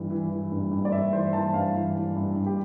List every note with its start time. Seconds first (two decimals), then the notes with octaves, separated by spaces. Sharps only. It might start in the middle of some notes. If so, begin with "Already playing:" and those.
Already playing: G2 E3
0.10 E3
0.31 E3
0.52 G2
0.71 G2
0.85 D5
0.92 G2 E5
1.13 E3 C5
1.33 E3 A5
1.54 G2 F5
1.75 E3
1.96 E3
2.16 G2
2.36 G2
2.46 G4